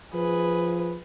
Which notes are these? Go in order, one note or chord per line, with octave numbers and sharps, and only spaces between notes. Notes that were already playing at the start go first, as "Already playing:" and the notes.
F3 G#4 B4